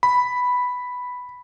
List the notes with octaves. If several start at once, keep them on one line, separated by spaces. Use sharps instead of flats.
B5